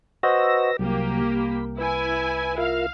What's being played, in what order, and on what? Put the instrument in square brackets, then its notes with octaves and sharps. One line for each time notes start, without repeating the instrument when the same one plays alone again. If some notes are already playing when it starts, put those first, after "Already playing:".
[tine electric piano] F#4 C5 D#5 [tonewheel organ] B4 E6 A#6
[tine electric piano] C2 [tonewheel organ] C3 F#3 [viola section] A#3 G4
[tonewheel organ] B5
[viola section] E4 G#5 [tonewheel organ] B4
[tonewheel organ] F4 A#4 E5 [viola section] F5